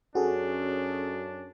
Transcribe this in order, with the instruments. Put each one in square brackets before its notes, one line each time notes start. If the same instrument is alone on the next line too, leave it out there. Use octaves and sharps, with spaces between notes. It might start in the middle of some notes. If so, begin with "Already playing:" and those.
[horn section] F#2 C#4 D4 [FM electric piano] F#4 G#4 A4